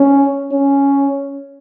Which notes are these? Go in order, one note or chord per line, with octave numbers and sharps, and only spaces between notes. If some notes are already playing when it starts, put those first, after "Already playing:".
Already playing: C#4
C#4